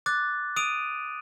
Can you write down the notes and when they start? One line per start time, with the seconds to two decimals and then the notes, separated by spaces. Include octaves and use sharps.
0.06 D6 F#6 A6
0.56 D#6 D7 D#7 F7